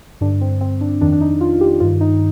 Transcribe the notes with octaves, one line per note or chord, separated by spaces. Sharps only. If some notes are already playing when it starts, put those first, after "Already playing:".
G2 D3 D4
C4
C4
D4
F2 D#3 D4
D4
D#4
F4
G4
G2 D#3 F4
D#4